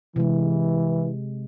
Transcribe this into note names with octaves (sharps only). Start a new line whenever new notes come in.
C3 E3 G#3